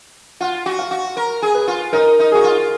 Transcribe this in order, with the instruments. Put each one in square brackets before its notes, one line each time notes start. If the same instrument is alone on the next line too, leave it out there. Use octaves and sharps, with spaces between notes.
[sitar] F4 [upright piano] F#5
[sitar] F#4
[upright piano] F5
[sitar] F#4
A#4
G#4
[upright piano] B4
[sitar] F4
[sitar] D#4 [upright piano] A#4
[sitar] D#4
[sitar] F#4 [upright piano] G#4
[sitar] F4